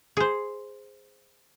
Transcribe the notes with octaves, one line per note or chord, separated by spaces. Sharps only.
G#4 C5